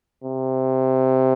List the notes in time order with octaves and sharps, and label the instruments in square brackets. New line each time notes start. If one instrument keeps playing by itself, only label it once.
[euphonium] C3